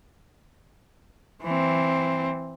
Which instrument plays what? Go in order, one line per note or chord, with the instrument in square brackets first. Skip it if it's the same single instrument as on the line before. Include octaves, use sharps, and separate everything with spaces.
[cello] E3 C4